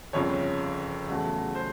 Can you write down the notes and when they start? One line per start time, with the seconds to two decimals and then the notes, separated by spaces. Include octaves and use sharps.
0.13 G1 F2 C#3 C#5
1.09 E2 C#3 F#3 A3
1.55 C5